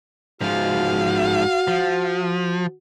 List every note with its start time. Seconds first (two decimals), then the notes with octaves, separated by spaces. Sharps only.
0.41 G#2 F3 F#4 F5
1.68 F3